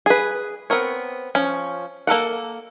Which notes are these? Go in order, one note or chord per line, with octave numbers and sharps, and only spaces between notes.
G#4 B4
B3 C4 A#4 C#5
F3 C#4
A#3 A4 A#4 F#5